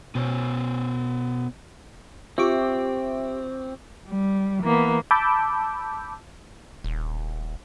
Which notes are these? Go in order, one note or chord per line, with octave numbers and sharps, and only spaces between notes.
B2 B3 C5 C#5
C4 F4 G4 E5 C#6 D6
G3
E3 A#3 B3
A5 B5 D6 E6 G6
D#1